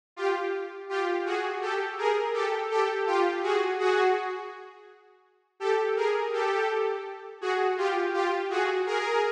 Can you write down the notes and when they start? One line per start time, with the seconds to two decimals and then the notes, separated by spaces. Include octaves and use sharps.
0.16 F4 G4
0.89 F4 G4
1.25 F#4 G#4
1.61 G4 A4
1.98 G#4 A#4
2.34 G4 A4
2.70 G4 A4
3.07 F4 G4
3.43 F#4 G#4
3.79 F#4 G#4
5.60 G4 A4
5.96 G#4 A#4
6.33 G4 A4
7.41 F#4 G#4
7.77 F4 G4
8.14 F4 G4
8.50 F#4 G#4
8.86 G#4 A#4